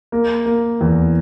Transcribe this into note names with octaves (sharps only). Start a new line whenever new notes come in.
A#3
A#3
E2